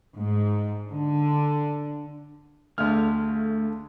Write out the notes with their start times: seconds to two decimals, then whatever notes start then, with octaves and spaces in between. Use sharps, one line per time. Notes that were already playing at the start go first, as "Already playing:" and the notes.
0.17 G#2
0.91 D3
2.78 D2 D3 A3 G#4 F5 F6